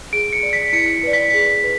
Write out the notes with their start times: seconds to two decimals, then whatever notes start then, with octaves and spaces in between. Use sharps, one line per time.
0.13 G#4 D7
0.33 C#7
0.43 D5
0.53 B6
0.73 E4 C#7
1.03 B4 D5
1.13 B6
1.33 G#4
1.63 B4